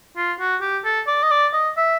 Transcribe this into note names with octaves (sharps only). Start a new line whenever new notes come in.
F4
F#4
G4
A4
D5
D#5
D5
D#5
E5